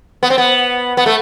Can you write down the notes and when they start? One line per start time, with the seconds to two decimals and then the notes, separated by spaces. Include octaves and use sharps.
0.23 B3
0.30 C4
0.38 B3
0.97 B3
1.06 A3